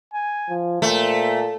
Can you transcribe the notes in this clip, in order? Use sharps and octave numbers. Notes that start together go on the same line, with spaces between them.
G#5
F3
A#2 A3 C5